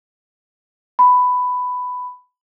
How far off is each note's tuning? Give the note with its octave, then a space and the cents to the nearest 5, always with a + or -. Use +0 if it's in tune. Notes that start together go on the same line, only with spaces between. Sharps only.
B5 +10